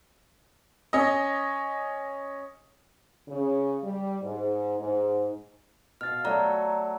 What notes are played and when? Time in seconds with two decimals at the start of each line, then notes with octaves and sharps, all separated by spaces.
0.93 C#4 D#5
3.28 C#3
3.84 G3
4.22 G#2
4.79 G#2
6.01 B2 F5 F6 A6
6.25 F#3 A3 D5 A#5